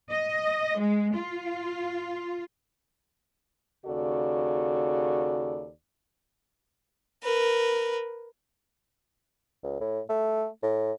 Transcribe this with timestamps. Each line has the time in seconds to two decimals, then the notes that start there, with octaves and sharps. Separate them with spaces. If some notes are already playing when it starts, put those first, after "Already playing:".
0.10 D#5
0.79 G#3
1.15 F4
3.86 D#2 C#3 F#4 A4 D5
7.23 A#4 B4
9.64 C#2
9.81 A2
10.09 A3
10.63 A2